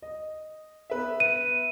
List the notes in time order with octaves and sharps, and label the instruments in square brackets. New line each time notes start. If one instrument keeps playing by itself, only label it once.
[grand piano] D#5
B3 B4 E5
[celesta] D#7